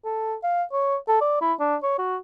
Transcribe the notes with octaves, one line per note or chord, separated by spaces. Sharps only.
A4
F5
C#5
A4
D5
E4
D4
C#5
F#4